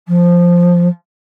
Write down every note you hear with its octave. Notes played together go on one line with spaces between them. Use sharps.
F3